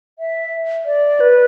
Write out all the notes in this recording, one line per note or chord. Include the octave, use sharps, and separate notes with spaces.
E5
D5
B4